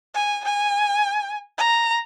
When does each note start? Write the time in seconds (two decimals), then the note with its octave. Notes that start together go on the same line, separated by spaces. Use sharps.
0.14 G#5
0.44 G#5
1.58 A#5